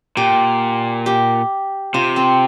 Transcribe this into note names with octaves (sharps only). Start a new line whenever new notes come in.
A#2 G4
G4
C3 F4
C4